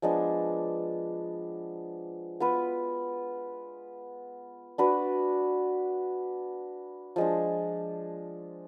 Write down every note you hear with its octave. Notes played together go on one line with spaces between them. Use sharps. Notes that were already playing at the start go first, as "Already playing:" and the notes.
F3 G#3 B3 D4
B3 F4 B4
D4 F#4 B4 D5
F3 G#3 D4